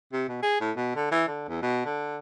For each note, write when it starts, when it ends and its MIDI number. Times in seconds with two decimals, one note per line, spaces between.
0.13 0.24 48
0.28 0.41 47
0.43 0.59 68
0.61 0.71 45
0.76 0.92 47
0.96 1.08 50
1.12 1.25 52
1.27 1.45 50
1.48 1.62 40
1.62 1.83 47
1.85 2.17 50